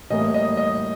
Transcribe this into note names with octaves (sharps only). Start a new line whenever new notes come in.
A2 E3 G3 A#3 D#5
D#5
D#5